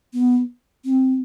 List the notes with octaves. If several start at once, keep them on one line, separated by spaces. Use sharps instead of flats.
B3
C4